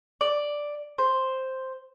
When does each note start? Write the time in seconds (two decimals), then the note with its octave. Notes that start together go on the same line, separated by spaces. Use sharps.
0.21 D5
0.98 C5